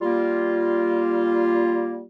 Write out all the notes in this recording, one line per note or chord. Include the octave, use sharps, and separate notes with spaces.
G3 A#3 F4